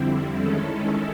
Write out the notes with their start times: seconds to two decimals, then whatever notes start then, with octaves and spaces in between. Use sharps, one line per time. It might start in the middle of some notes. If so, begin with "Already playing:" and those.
Already playing: F2 D3 G3 C4 E4
0.40 D#3 G#3 C#4 E4 A4